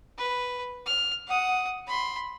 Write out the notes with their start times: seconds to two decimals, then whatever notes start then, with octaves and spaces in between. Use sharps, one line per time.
0.18 B4
0.86 F6
1.27 F#5 D#6
1.87 B5 C6